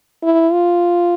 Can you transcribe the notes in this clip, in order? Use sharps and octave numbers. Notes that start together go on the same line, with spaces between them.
E4
F4